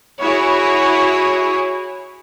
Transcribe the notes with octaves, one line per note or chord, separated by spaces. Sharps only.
E4 F#4 G#4 C#5